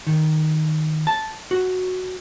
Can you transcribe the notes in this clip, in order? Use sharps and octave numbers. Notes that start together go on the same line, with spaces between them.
D#3
A5
F#4